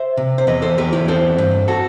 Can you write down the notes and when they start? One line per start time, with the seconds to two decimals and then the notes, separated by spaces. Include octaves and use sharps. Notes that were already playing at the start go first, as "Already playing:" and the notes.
Already playing: C5 E5
0.17 C3
0.38 C5
0.47 E2 B4 D#5
0.62 A4 C5
0.78 E2 G4 B4
0.93 E4 G4
1.08 C4 A4 C5
1.38 G2
1.68 F#4 A4